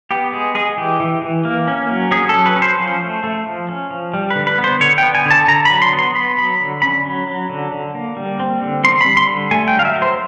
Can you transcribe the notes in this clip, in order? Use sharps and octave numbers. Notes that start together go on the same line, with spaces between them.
B3 G4
G#3 G#4
G#3 G#4
E3 G4
E3
E3
A#3
C#4
F#3
C#4 G#4
A4
F#3
B4
C#4
C5
F3
A3
A3
F3
C#4
F3
G3
B4
D3
B4
B3
C5
D3 C#5
B3 G5
G#5
D3 A5
D3 A#5
B5
F#3
C6
B3
C6
B3 B5
F#3 B5
D3
C#4 B5
F#3
F#3
D3
D3
A#3
G3
C4
D3
C4 C6
B5
G3
C6
D3
A3 G#5
G5
F#3
F5
E5
F#3
C5